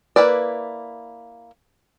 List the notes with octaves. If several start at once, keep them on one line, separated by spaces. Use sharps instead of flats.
A#3 C#4 E4 B4 D5